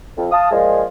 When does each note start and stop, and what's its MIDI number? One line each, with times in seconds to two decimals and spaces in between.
0.18 0.28 41
0.32 0.50 77
0.32 0.50 81
0.32 0.50 87
0.51 0.83 46
0.51 0.83 53
0.51 0.83 56
0.51 0.83 65